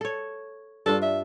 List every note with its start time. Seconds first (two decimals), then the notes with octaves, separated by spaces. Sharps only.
0.01 A4 C#5
0.86 G2 D4 F4 A4
1.02 E5